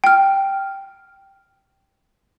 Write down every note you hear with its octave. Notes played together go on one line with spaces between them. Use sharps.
G5 F6